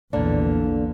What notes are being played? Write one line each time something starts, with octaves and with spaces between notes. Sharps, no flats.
A#1 E2 D3 A#3 D5